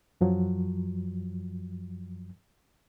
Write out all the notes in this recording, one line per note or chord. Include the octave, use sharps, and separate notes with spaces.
F#2 F3 F#3